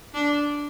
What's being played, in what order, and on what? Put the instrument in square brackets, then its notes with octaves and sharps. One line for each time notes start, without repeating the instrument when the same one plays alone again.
[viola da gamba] D4